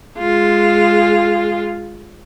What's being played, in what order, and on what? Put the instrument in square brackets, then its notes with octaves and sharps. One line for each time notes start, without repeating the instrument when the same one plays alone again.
[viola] G#3 F4